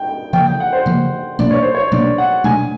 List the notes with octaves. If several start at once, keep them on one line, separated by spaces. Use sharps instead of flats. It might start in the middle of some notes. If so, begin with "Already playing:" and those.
Already playing: G5
C#3 F3 A#3 G5
G5
F#5
C5
C#3 F3 A#3
B2 F#3 A#3 D4 D5
C#5
C5
C#5
B2 F#3 A#3 D4 D5
F#5
B2 F#3 A3 D4 G#5